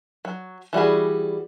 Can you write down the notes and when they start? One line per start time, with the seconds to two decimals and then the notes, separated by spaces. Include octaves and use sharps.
0.25 F#3
0.73 E3 G3 F#4 G#4